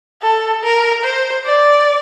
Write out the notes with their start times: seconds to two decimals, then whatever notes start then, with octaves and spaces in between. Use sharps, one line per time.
0.22 A4
0.63 A#4
1.04 C5
1.46 D5